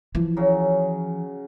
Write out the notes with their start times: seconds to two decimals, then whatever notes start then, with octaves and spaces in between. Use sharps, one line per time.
0.15 E3 F3
0.37 C#3 F#3